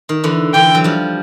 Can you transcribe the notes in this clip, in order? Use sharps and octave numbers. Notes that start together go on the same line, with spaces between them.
D#3
D3 E3
D3 E3 G5
E3 F#3
F3 G3